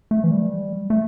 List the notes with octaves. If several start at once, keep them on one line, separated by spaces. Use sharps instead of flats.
A3
E3
G3
A3